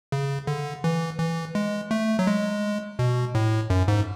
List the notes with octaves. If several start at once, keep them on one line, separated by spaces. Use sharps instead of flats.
C#3
D3
E3
E3
G#3
A3
F#3
G#3
B2
A2
F#2
G#2